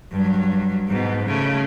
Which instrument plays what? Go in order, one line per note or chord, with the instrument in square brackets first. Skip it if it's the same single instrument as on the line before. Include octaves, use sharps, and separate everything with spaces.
[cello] G2 F#3
G#2 B2
C#3 A3